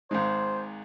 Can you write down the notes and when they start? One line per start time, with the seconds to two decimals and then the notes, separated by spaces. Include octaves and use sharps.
0.11 G#1 G#2 G#3 C5